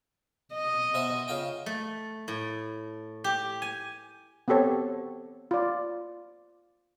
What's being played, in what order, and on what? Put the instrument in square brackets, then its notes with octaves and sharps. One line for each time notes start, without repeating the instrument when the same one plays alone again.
[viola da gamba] D#5
[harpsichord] B2 C5 E5
C#3 F4 G5
[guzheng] A3
A2
G4
G#5
[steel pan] B3 C4 G4 A4 C#5
F4 D5